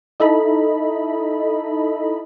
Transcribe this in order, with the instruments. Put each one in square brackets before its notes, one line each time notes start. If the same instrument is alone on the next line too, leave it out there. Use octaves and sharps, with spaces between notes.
[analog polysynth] D#4 E4 A4 D#5 B5